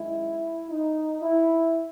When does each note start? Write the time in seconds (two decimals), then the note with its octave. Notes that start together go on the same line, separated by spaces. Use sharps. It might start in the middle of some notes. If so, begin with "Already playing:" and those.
Already playing: F#2 D#3 G#3 E4
0.71 D#4
1.21 E4